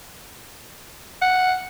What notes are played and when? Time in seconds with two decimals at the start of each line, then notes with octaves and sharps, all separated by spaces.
1.21 F#5